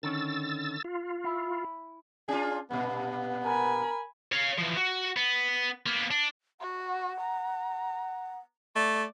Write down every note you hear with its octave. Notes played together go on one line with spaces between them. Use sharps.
D3 D#3 C#4 E6 A6
F4
E4
C#4 D4 F4 G#4
G2 A#2 B3
A#4 G#5 B5
C#5 F5
E3 F3
F#4
B3
A#3 B3
D4
F#4 F#5
A#5
A3 D5